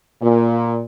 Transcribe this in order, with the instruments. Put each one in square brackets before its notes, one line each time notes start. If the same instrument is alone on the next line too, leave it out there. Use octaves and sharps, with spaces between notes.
[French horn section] A#2